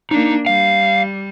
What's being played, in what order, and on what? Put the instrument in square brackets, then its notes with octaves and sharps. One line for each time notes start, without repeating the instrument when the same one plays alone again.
[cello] A#3 D4 [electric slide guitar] D#4
[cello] G3 [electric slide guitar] F5